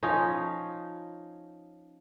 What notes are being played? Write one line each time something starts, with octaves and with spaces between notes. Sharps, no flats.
F3 C#4 D#4